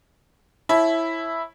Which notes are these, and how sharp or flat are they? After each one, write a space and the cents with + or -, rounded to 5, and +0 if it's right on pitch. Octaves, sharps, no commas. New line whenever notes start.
E4 +0 C#5 -35 A5 -35